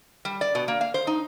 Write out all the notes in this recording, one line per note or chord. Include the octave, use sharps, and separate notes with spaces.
G3
D5
B2
A#3
F5
C5
D#4